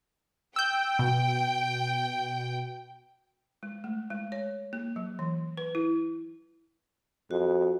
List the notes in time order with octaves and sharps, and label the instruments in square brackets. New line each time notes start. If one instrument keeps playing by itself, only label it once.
[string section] G5 [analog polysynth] E6 G6
[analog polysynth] B2
[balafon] G#3
A3
G#3
C#5
A#3
F#3
E3
B4
E4
[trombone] F2 [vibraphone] F#4